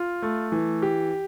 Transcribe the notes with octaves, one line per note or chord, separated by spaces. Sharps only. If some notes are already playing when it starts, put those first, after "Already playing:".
Already playing: F4
A3
E3
G4